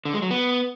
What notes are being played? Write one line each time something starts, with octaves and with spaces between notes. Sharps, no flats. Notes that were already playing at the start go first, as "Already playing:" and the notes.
D3
G#3
F#3
B3